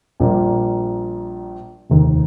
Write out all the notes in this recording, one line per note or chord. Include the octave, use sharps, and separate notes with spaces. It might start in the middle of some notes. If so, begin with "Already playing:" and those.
A#1 A#2 G3 A#3
F1 D#2 D#3